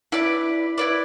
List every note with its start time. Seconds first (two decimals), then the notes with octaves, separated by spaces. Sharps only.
0.12 E4 B4 D5
0.78 E4 B4 D5